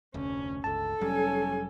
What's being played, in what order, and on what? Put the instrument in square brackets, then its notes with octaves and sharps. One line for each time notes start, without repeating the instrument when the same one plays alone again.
[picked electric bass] F1 D2 [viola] C#4
[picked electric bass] G1 C#2 [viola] A4 [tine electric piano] A5
[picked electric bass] F1 F#3 G3 [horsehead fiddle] C#4 G#5